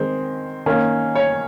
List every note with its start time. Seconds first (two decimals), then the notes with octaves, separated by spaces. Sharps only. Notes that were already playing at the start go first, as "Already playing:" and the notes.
Already playing: D#3 G#3 C4
0.66 D#3 A#3 C#4
1.15 C#5